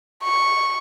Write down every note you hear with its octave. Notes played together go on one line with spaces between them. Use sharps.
C#6